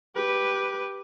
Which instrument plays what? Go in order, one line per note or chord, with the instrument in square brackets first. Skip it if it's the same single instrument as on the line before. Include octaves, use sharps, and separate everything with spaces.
[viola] G4 B4